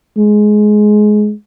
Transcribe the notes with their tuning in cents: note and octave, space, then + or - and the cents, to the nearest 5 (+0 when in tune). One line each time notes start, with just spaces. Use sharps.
G#3 +15